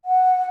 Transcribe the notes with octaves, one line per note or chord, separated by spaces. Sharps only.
F#5